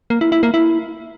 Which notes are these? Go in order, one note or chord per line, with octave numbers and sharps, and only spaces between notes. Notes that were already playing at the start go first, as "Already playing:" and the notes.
A#3
E4
E4
A#3
E4